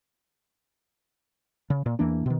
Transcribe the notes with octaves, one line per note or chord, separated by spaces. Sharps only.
C#3
A#2
E2 E3 A#3 D4
B2 D#3